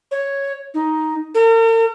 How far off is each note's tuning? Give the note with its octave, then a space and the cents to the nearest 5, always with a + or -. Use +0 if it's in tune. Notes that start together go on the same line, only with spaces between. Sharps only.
C#5 +0
D#4 +5
A#4 -45